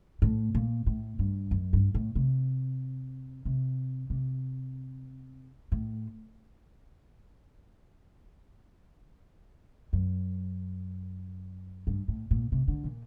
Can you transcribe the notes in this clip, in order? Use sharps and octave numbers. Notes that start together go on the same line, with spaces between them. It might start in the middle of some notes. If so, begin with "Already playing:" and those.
A2
A#2
A2
G2
F#2
G2
A2
C3
C3
C3
A2
F#2
G2
A2
A#2
C3
D3
A#2